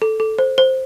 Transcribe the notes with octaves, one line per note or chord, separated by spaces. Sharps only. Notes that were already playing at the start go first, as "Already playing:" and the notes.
A4
A4
C5
C5